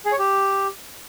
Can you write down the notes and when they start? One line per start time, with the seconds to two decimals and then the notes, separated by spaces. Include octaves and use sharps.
0.05 G#4
0.12 C#5
0.19 G4